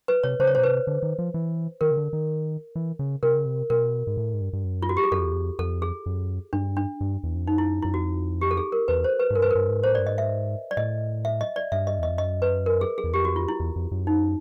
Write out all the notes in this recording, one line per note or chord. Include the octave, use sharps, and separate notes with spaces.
B4
C3 C#5
C#3 C5
C#5
B2 C5
C3 B4
D3
D#3
F3
E3
D#3 A#4
C#3
D3
D#3
E3
C#3
C3 A#4
C#3
C3
B2 A#4
G#2
A2
G#2
G2
G2
F#2
F4
F#4
G4
G#4
F#2 A4
F2
E2
F2
F2 A4
G#4
F#2
G2 D4
D4
G2
E2
F2
F#2 D#4
E4
F#2 E4
F2 F#4
G4
A4
G#4
A#4
E2 B4
C5
B4
G#2
G2 A#4
B4
G2 A#4
G#2
A2 C5
D5
G2
G#2 D#5
E5
D5
A2 D#5
E5
D#5
D5
G2 E5
D#5
E2 D#5
F2
F#2 D#5
B4
A#4
G#4
G#4
E2
F2 G4
F#4
F4
E4
E2
F2
F#2
D#4